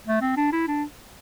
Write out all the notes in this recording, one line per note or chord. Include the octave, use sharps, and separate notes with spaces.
A3
C4
D4
E4
D4